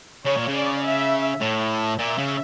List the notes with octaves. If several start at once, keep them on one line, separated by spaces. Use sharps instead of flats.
C#3 C#5
A#2
C#3
D5
E5
A2
A#2 E5
C#3